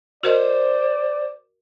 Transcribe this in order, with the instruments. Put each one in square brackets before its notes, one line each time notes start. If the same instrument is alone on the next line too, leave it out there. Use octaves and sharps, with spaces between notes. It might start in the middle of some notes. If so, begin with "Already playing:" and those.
[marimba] F#4 A#4 D#5 [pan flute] C5 [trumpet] D5